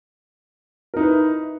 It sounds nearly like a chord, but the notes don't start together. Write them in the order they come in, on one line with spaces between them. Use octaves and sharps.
A#4 D#4 E4 B4